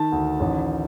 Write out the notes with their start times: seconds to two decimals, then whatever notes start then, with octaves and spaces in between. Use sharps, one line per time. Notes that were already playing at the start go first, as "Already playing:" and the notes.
Already playing: D#3 A5
0.12 D2
0.40 A1